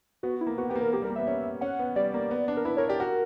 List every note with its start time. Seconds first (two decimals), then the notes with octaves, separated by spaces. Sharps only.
0.23 B3 F#4
0.41 E4
0.47 A#3
0.58 B3 F#4
0.70 B3 G4
0.76 A#3
0.81 A#4
0.93 A#3 G4
1.02 G3
1.05 A#4
1.10 A#3
1.16 B3 E5
1.27 C#4
1.61 C#4 F#5
1.79 B3
1.96 G3 D5
2.14 A#3
2.31 B3
2.48 D4
2.57 A#4
2.65 E4 B4
2.77 A#4 C#5
2.89 G4 D5
3.00 F#4 A#4